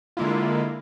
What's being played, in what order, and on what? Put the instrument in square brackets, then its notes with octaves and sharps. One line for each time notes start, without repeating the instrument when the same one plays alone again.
[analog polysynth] D3 G#3 A#3 E4 F4